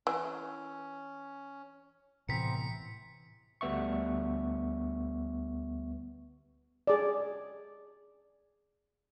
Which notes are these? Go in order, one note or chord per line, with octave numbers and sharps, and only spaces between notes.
E3 C#4
A2 C3 E3 B3 C4 A#5 B6 C#7
D2 G3 B3 E5 C#6
G#4 D5